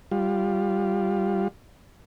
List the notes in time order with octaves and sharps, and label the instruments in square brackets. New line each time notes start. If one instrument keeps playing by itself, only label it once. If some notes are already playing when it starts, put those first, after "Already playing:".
[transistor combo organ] G3 F4